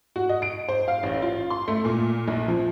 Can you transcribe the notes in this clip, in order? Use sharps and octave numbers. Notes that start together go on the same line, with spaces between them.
F#4
D#5
D7
C5
F5
A1
F4
C6
A3
A#2
A#1
F3